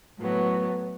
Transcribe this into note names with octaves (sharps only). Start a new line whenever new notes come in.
A2 F#3 B3